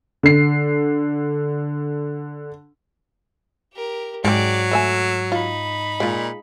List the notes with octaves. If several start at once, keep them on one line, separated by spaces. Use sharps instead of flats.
D3 C7
G4 A#4
G#2 F#3 G#3 C4 D5 D6
A3 E5 G#5 E6
D#4 F4 B5
A#2 G#3 F4